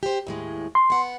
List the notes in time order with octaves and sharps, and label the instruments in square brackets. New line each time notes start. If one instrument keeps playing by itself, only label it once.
[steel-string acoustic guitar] G4 C5
D#2 A2 G#3
[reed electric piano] C6
[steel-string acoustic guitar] B3 F#5